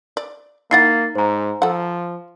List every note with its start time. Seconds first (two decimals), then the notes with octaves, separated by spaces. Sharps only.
0.17 D5
0.71 A#3 D#4 E4 F#5 A6 C7
1.15 G#2 C5 A#5
1.62 F3 A4 F#5